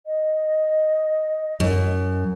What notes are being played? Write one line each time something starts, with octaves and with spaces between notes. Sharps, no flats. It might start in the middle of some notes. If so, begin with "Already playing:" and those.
D#5
F#2